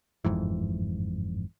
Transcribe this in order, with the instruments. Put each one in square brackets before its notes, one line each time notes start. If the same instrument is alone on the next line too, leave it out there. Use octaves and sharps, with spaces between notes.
[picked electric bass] G1 F2 G#2 E3